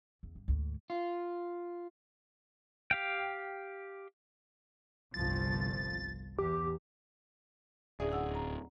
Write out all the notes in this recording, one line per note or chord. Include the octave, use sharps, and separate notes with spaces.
E2
G2
D2 G#2
F4
G4 F5 G5
G1 C2 F3 A6
E2 G4
D1 C#4 G#4 D5 E5
D#2 F#5 E6
A#5